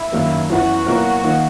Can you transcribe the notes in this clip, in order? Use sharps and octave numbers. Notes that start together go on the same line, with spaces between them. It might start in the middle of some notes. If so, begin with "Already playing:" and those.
Already playing: E4
F#2 D#3 F#3 A#3
F#2 E3 B3 E4 F#4 B4
B2 F#3 A#3 E4 F#4 A#4
D#3 A#3 D#4